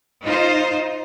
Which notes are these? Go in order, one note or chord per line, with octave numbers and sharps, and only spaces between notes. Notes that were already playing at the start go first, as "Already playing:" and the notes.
D#4 F4 C5